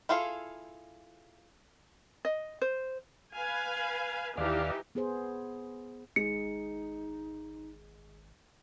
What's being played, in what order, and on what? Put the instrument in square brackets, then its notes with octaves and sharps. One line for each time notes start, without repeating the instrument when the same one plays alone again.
[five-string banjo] E4 F4 G#4 A4 F5
[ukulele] D#5
C5
[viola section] B4 F5 G#5
[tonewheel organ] D#2 D5 F5 [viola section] E3 D#4 G4
[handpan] B3 G#4 C5
[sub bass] G#1 [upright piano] G#3 [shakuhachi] D#4 [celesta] C#7